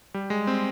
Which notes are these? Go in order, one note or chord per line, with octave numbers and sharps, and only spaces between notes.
G3
G#3
C4